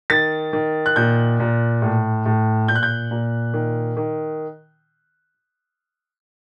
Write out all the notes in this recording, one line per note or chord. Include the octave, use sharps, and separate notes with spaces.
D#3 A6
D#3
F#6
A#2 G6
A#2
A2
A2
A#2 G6
F#6
G6
A#2
D#3
D#3